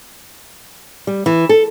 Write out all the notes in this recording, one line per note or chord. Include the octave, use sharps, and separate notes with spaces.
G3
E3
A4